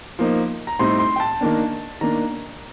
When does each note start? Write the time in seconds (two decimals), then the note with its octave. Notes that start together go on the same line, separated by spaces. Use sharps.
0.19 F3 A#3 D#4
0.67 A#5
0.79 A2 G3 C4 D#4 C6
0.99 C6
1.16 G5
1.20 A5
1.41 D#3 A#3 D4
2.01 D#3 A#3 D4 A#5